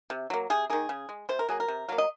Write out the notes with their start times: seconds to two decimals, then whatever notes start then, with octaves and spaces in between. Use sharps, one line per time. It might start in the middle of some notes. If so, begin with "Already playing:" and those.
0.10 C3
0.30 F#3 A#3
0.50 C3 G#4
0.70 D#3 A#3 G#4
0.89 C#3
1.09 G#3
1.29 C3 C5
1.39 A#4
1.49 F#3 A#3 G#4
1.60 A#4
1.68 C3
1.88 F#3 A#3 F5
1.98 D#5